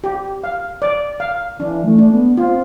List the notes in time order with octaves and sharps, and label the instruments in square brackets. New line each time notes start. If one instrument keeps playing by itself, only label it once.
[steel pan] G4
F5
D5
F5
[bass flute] E3 [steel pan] D4
[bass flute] A3
[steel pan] D4
[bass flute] B3
[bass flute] C4 [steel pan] F4